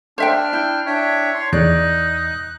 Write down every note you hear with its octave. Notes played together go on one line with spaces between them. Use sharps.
D4 C5 E5 G5 F6
E4 G5
D4 C#5 E5 G5
C6
E2 D#4 D5 F#6